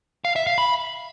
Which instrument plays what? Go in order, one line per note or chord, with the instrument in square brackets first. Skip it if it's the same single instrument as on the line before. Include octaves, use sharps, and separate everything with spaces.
[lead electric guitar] F5
E5
F5
B5